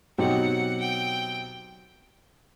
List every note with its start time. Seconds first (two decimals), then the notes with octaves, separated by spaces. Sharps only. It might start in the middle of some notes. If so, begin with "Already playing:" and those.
0.18 B2 F#3 C4 D#4 G4 F#5
0.80 G5